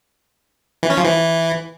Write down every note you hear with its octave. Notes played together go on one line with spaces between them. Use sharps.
E3
C#4
F3
E3